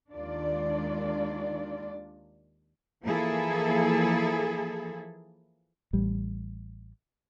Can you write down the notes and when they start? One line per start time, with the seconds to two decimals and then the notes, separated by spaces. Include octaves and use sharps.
0.14 D#2 D#3 G#3 D4 F4 D5
3.04 E3 F3 A#3 E4 G#4 A4
5.93 A1 G3